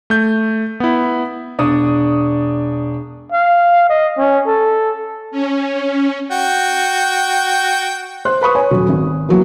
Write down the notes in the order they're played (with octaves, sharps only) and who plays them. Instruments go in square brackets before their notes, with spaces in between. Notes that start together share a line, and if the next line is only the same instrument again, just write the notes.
[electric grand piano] A3 G6
B3 E4
[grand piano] E1 D4 D5 C#6 D#6
[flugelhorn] F5
D#5
C#4
A4
[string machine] C#4
[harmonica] F#4 G5
[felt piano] C5 C6 F#6
B4 B5 C#6 D#6
C#5 G#5
D#1 F#3
G#1
E3 F#3 A#3